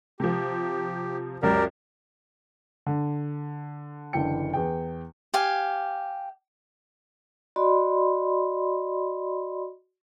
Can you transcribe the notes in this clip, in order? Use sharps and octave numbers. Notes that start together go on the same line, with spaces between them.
C3 F3 G4
C#2 F#2 G4 A#4 D5
D3
F#1 D3 E3 D4 G5 C#7
E2 G#4 G5
G4 F5 G#5
F#4 D5 D#5 B5 C6